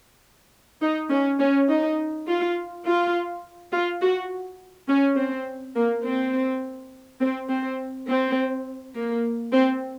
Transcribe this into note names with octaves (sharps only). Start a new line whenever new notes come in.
D#4
C#4
C#4
D#4
F4
F4
F4
F#4
C#4
C4
A#3
C4
C4
C4
C4
A#3
C4